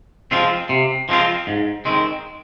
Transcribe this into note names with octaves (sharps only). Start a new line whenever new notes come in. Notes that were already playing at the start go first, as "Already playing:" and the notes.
F3 G#3 C4 F4
C3
F3 G#3 C4 F4
G#2
D#3 G#3 C4